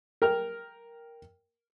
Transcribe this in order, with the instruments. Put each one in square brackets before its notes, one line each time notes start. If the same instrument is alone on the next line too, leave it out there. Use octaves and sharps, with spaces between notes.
[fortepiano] A#4 G5 F6